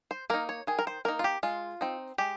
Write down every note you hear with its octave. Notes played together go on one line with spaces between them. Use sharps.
C5
A#3 D#4 A#4
C#5
D#3 G#4
A#4
C5
A#3 D#4 A#4
F4
G4
G#3 F4
C4 D#4
G#3 G4